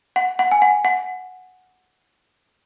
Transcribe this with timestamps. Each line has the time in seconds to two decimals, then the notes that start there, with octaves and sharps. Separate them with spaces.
0.16 F#5
0.39 F#5
0.52 G#5
0.62 F#5
0.85 F#5